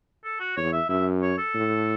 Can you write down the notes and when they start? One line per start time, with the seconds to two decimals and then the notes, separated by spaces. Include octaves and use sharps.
0.24 A4
0.40 F#4
0.56 E2 C#5
0.72 E5
0.89 F#2 E5
1.22 C#5
1.38 A4
1.55 A2